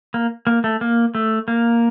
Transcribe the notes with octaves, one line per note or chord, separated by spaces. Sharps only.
A#3
A#3
A3
A#3
A3
A#3